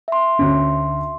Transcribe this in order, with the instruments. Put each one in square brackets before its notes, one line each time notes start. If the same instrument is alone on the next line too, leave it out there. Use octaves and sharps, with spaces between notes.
[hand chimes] E5 C6
[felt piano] D2 C#4